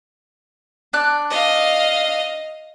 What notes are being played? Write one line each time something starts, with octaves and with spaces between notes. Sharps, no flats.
D4 D5 F#6
D#5 F5